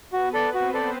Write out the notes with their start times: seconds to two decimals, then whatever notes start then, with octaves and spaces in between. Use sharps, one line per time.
0.13 B3 F#4 B4
0.33 A4 D5
0.53 C4 F#4 C5
0.74 A4 D5